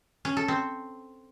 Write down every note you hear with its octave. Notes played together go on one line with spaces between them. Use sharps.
C#4
A4
C4